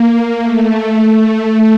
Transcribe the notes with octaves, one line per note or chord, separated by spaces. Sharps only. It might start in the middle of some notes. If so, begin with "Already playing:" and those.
Already playing: A#3
A3
A3